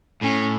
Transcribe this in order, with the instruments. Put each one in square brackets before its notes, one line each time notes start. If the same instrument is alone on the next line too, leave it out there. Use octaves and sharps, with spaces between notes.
[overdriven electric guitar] A2 [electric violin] C#4